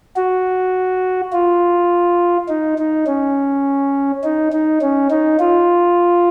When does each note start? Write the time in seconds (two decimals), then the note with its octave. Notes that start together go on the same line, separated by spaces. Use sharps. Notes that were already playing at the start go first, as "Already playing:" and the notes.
0.16 F#4
1.33 F4
2.48 D#4
2.78 D#4
3.07 C#4
4.23 D#4
4.52 D#4
4.81 C#4
5.10 D#4
5.40 F4